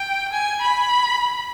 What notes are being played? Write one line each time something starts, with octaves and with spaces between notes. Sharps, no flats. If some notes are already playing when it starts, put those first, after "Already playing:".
Already playing: G5
G#5
B5